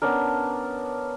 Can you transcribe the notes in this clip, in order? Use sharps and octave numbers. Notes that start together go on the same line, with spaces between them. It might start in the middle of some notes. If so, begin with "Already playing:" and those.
B3 C#4 D4 A#4